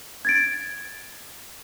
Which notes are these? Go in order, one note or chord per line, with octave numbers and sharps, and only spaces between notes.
G#6 A6 D7